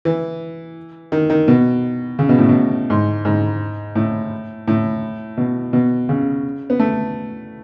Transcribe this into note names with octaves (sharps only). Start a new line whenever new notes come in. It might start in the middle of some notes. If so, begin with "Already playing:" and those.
E3
D#3
D#3
B2
C#3
B2
A2
B2
G#2
G#2
A2
A2
B2
B2
C#3
B3
A3